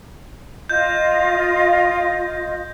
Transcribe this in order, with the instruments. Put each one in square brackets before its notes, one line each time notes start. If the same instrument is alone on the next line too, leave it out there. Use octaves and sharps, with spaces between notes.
[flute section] F4 D#5 [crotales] G6